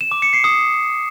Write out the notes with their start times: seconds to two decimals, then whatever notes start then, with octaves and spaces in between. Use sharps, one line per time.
0.01 E7
0.11 D6
0.22 C#7
0.33 C7
0.44 D#6